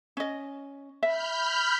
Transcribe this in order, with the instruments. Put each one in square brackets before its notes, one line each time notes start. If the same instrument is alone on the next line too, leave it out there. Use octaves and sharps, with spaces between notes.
[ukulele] C#4 D#5
[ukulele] E5 [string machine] B5 F6 G6